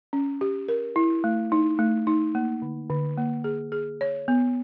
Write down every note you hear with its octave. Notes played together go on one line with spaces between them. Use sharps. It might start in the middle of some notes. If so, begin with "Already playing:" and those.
C#4
G4
A#4
E4
A3
D#4
A3
D#4
A#3
D3
D3
A#3
G#4
G#4
C#5
B3